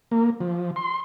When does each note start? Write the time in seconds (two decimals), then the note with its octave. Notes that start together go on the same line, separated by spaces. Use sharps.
0.11 A#3
0.41 F3
0.76 C6